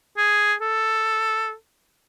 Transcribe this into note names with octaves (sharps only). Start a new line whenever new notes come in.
G#4
A4